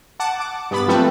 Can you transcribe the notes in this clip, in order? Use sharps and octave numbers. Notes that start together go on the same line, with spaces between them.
F#5 A5 D6
D6
G2 B3 B5 A6
F3 G3 A3 C4 A4 B4